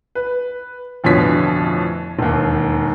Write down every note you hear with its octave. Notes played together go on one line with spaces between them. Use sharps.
B4
A1 F2 B2 D3 C#5 B6
E1 D#2